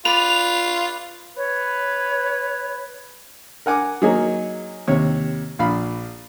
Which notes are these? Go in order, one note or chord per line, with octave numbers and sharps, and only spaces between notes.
F4 B4 D5 F7
B4 C#5
A#4 F#5 G#5 D6
F#3 A#3 D#4 G#4 C#5
D#2 C3 C#5
A#1 F5 B5